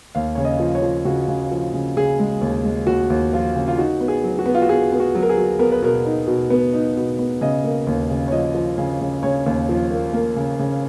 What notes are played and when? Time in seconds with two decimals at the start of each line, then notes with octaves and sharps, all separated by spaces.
0.15 D#2 F5
0.35 C#3 C#5
0.45 D#5
0.60 F3
0.75 C#5
0.82 F3
1.05 C#3 F#4
1.28 C#3
1.51 F3
1.74 C#3
1.97 C#3 G#4
2.19 G#3
2.41 D#2
2.64 G#3
2.87 D#2 F#4
3.10 D#2
3.33 F3 F4
3.55 C#3
3.68 F4
3.78 D#4 F#4
4.01 B3
4.08 G#4
4.24 F#3
4.39 F#4
4.46 B3
4.55 F4
4.62 F#4
4.69 B3 G#4
4.92 B3
5.00 F#4
5.15 F#3
5.23 A#4
5.29 G#4
5.37 F#3
5.59 B3 A#4
5.72 B4
5.82 B2 A#4
6.05 D#4
6.27 B2
6.50 B3
6.73 D#4
6.97 B2
7.19 B3
7.41 C#3 D#5
7.64 A#3
7.87 D#2
8.10 C#3
8.28 C#5
8.32 F3 D#5
8.55 F3
8.78 C#3
9.01 C#3
9.23 C#3 C#5
9.46 D#2
9.69 F3
9.91 A#3
10.14 A#3
10.36 C#3
10.59 C#3